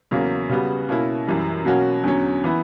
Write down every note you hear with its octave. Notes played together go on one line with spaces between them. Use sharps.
E2 C#3 F#3 A#3 C#4
C#3 G3 B3 F#4
B2 A#3 C#4 E4
F#2 E3 G3
B2 F#3 A#3 C#4 F#4
E2 D3 F#3 C#4
E3 B3 E4